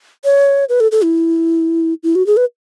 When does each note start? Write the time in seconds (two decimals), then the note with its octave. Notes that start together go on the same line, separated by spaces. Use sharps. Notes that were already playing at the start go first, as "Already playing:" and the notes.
0.25 C#5
0.69 B4
0.80 A4
0.92 A4
1.03 E4
2.03 E4
2.15 F#4
2.27 G#4
2.37 B4